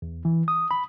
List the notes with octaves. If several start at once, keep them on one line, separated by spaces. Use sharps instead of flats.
E2
E3
D#6
B5